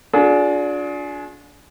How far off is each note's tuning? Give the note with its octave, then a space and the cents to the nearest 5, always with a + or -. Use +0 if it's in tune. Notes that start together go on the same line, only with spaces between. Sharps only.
D4 -15 F4 +45 G#4 +25